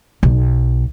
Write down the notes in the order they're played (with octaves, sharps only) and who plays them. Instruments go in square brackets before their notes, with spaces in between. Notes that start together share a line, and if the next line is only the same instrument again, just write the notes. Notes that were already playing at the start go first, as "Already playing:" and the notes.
[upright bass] B1